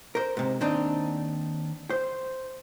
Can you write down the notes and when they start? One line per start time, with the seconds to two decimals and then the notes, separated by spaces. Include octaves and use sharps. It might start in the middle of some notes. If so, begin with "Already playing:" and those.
0.15 A#4 C5
0.37 G#2 C3
0.61 D#2 C4 D4 D#4
1.90 C5